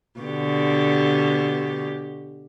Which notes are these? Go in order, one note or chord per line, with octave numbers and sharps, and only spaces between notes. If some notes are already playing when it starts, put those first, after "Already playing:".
B2 D3 G4